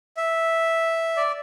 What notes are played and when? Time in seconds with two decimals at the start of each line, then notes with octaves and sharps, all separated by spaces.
0.17 E5
1.17 D5